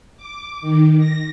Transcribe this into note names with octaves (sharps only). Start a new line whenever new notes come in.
D6
D#3
A#6